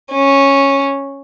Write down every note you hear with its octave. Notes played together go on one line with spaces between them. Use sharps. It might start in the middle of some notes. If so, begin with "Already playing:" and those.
C#4